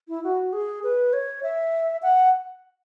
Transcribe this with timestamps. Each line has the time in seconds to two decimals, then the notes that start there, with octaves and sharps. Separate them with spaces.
0.09 E4
0.24 F#4
0.53 G#4
0.84 B4
1.13 C#5
1.43 E5
2.02 F#5